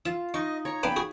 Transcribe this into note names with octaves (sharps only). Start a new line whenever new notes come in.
F4 E5
D#4 D#5 C#6
C#5 A#5
C#3 A#3 B3 D4 G5 B5
F#4 G#4